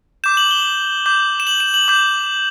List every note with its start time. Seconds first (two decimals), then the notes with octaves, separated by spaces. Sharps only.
0.24 D6 G6 E7
0.37 F#7
0.51 G7
1.06 D6 G6
1.40 E7
1.47 F#7
1.60 E7
1.74 F#7
1.88 D6 G6